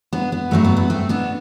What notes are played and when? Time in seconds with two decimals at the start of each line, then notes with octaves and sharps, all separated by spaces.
0.13 B3 D4
0.32 B3
0.51 G2 D3 F#3 A3
0.64 B3
0.77 B3
0.90 A3 C4
1.09 B3 D4